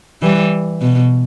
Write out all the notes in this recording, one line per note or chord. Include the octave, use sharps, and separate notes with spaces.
E3 G3
B2